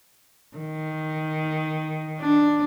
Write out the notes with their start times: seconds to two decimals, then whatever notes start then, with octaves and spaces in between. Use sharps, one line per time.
0.57 D#3
2.20 D4